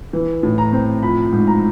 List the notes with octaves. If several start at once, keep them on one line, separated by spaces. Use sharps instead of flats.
E3
A2
A#5
C4
F3 B5
G#2
A#5